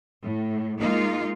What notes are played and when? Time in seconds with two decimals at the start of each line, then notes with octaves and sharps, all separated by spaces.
0.22 A2
0.79 G#3 A#3 D#4 F4